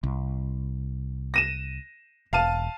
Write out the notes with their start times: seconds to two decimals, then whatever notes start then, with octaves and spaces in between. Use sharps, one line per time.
0.03 C2
1.34 A#6 D#7 E7
2.33 E1 F5 A5 D#7